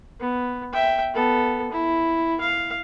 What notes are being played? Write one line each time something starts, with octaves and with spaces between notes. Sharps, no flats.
B3
E5 G5
B3 A4
E4
F5